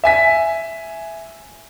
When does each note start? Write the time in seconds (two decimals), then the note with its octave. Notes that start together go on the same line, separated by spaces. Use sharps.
0.04 E5 G#5 B6